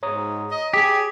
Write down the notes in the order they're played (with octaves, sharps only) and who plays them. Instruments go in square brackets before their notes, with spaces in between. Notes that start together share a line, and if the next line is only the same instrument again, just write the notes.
[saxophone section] G#2 [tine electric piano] C#5 A#5 D#6
[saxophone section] D#5
[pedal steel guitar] G4 [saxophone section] G#4